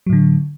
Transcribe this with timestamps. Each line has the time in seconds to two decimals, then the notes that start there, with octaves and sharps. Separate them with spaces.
0.06 F#3
0.10 A2
0.13 D3